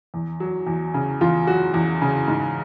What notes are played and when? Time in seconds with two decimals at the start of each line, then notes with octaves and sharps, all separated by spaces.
0.14 E2
0.40 F#3
0.67 E2
0.94 C#3
1.21 E2 F4
1.47 F#3 F#4
1.74 E2
2.02 C#3
2.28 G#2